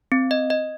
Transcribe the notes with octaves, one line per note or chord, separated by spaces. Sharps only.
C4
D#5
D#5